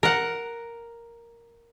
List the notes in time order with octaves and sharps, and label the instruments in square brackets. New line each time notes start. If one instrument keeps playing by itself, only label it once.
[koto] A#4 F#5